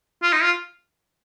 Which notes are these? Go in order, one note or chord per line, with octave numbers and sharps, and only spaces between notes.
F4
D#4
F4